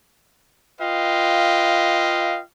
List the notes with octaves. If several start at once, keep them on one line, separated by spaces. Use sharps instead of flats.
F4 B4 D#5 F5 G5